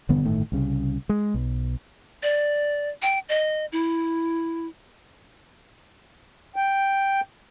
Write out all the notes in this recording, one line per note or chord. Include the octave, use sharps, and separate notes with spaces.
E1 G2 D3 B3
G1 A2 D#3 A3
C2 C#3
G#3
B1
D5
G5
D#5
E4
G5